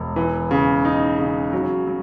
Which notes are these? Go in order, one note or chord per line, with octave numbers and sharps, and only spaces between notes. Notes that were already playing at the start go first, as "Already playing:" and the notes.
Already playing: E1
E3
C#3
D#4
C#3
F#3
F#3